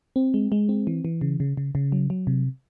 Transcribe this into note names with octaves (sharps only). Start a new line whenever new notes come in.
C4
G#3
G#3
C4
E3
E3
C#3
C#3
C#3
C#3
F#3
F#3
C3